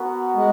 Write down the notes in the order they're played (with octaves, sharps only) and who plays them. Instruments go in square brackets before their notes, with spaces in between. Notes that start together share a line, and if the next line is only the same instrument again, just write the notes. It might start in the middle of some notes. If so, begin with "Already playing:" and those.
Already playing: [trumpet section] B3 F#4 A#4
[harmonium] G#3